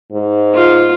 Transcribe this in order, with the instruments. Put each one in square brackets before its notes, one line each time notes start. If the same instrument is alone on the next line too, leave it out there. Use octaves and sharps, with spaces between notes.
[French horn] G#2
[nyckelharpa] F4